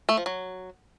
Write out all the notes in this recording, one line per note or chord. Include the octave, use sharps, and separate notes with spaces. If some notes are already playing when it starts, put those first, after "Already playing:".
A3
F3
F#3